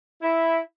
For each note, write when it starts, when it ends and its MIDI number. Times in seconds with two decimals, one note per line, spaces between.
0.22 0.59 64